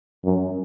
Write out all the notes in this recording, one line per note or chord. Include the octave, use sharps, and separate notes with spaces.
F#2